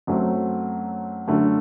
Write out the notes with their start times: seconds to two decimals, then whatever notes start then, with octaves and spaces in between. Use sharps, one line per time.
0.07 F#2 F#3 A3 C4
1.28 F#2 D3 A3